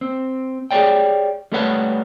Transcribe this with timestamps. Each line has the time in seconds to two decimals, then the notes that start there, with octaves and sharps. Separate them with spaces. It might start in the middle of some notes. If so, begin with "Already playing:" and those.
0.01 C4
0.71 G4 G#4 A#4 C#5 D5 G5
1.52 G3 A3 A4 B4 C#5 F#5